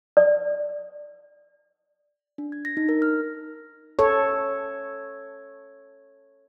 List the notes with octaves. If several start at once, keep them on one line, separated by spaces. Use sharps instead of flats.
D5
D4
G#6
A#6
D#4
A#4
F6
A4 C#5